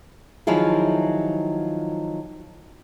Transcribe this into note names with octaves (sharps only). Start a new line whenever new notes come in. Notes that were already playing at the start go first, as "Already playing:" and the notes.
D#3 F3 F#3 E4 F4 G#4